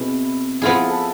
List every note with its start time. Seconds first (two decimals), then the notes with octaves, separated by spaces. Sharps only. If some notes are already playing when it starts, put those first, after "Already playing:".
Already playing: B2 C4 E4 G#4
0.62 F3 B3 E4 F4 G#4
0.87 A4
0.92 B4